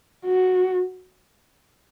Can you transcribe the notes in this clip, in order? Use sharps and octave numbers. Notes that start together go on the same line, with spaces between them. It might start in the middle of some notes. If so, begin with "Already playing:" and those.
F#4